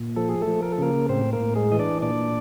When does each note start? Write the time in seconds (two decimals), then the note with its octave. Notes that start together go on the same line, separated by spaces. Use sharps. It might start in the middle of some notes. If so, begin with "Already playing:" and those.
Already playing: A#2
0.16 F3 A4
0.29 G#4
0.42 A3 A4
0.47 F3
0.62 A#4
0.72 A4
0.78 C#3 A#3 A#4
1.09 A2 C4 C5
1.33 A#3 A#4
1.40 A2
1.55 G#3 G#4
1.72 E3 D#5
1.79 D4 D5
2.02 A#2 D4 D5